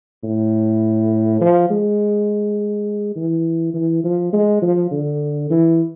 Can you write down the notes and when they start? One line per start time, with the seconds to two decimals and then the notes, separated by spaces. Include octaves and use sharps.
0.24 A2
1.41 F3
1.70 G#3
3.16 E3
3.74 E3
4.04 F3
4.33 G#3
4.62 F3
4.91 D3
5.50 E3